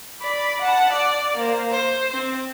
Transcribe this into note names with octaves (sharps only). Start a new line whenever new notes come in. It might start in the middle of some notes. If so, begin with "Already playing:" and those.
D5 B5
F#5 A5
D5
A#3 C5
C5
C4